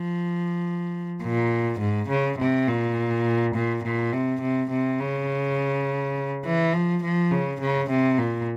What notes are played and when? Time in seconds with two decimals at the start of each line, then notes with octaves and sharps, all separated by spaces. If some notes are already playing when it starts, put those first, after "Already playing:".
Already playing: F3
1.22 A#2
1.80 G#2
2.09 C#3
2.38 C3
2.67 A#2
3.55 A#2
3.83 A#2
4.12 C3
4.41 C3
4.70 C3
4.99 C#3
6.45 E3
6.73 F3
7.02 F3
7.31 C#3
7.60 C#3
7.90 C3
8.18 A#2